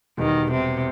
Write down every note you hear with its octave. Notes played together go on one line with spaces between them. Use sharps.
E1 E2 B2 D#3 G3 B3
C3